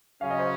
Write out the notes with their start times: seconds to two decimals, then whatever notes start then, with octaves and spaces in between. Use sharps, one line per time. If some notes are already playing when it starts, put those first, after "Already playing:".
0.21 C#3 F#3 C#4 F5
0.30 D#5
0.39 C5